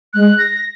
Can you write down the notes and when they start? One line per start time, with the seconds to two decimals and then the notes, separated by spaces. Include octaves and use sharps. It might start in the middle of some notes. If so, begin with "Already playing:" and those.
0.13 G#3 F#6
0.38 A#6